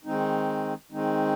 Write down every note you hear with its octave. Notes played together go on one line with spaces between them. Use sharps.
D#3 G#3 C4 D#4
D#3 G#3 C4 D#4